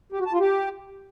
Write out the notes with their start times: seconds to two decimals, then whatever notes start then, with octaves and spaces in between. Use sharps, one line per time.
0.12 G4
0.19 F#4
0.26 A5
0.33 F4
0.40 G4